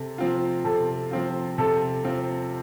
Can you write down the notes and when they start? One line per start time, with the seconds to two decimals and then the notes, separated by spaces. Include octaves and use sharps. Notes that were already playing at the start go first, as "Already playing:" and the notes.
Already playing: C3 A4
0.18 F3 C4 F4
0.64 C3 A4
1.11 F3 C4 F4
1.58 C3 A4
2.04 F3 C4 F4